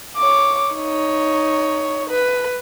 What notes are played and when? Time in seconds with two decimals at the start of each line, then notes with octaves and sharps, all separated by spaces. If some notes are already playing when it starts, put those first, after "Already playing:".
0.17 C#5 D6
0.74 D#4 C#5
2.10 B4